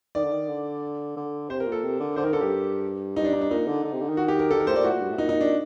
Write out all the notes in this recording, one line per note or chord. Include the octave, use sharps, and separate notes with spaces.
D#3 D5
D3
D#3
D3
D3
C3 C5
A#4
A#2
A4
C3
D3
D3 C5
D#3 A#4
D3 A4
G2 G4
G2 D#4
D4
D#4
D4
A#2 D#4
D3
D3
C3
D3
D#3
F#4
G4
A#4
D3 A4
D#3 A#4
A2 C5
A#2 D5
A2 F#4
A#2
G2
A2
A#2 D#4
D#4
D4